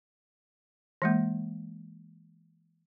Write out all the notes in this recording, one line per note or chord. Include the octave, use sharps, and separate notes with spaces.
E3 G#3 A#3